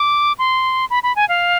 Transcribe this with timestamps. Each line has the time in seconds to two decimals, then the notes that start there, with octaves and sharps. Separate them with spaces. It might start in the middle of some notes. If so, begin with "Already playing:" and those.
Already playing: D6
0.39 C6
0.90 B5
1.03 B5
1.16 G#5
1.29 F5